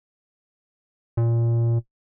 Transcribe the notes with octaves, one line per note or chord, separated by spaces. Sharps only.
A#2